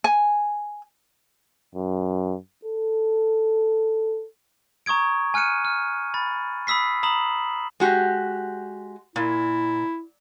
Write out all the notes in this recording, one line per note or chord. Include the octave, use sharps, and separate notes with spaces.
G#5
F#2
A4
A#5 C#6 D#6 G#6 D7
G#5 F6 F#6 C#7 D#7
F6
B5 A6
B5 D#6 E6 B6 C7
A#5 B5 D#6 E7 F#7
G#3 F#4 G4
A#2 E4